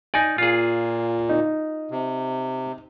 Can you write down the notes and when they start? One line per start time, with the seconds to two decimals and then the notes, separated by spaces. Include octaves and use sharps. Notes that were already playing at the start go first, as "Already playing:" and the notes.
0.14 D#4 D5 G#5
0.38 A#2 F4 G#4
1.29 D#4
1.91 C3